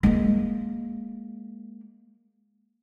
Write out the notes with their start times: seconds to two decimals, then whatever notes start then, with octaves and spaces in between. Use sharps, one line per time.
0.03 G#3 A#3